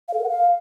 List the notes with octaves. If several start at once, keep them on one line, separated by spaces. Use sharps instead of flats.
F5
A4
A#4
F#5
F5